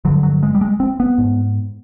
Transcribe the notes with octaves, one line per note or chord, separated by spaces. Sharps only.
G2 D3 F#3
F#3
G#3
G3
G#3
C4
B3
G#2